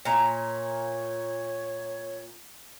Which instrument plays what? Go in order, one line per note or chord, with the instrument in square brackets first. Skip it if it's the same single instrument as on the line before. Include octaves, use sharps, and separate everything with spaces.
[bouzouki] A#2 A#5 [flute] C#5